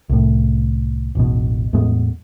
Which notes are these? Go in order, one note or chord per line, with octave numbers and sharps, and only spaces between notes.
C2 A2
E1 A1 B2
E2 A2 G#3 B3